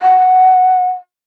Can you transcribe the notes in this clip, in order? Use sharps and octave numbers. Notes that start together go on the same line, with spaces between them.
F#5